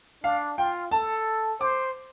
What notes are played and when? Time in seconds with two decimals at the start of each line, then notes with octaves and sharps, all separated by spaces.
0.23 D4 F5
0.58 F4 G5
0.91 A4 A5
1.60 C5 D6